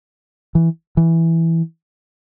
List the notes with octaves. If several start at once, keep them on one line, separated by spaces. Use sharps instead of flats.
E3
E3